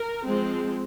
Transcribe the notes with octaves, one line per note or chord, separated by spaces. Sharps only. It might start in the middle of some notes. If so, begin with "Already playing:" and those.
Already playing: A#4
F3 G#3 C4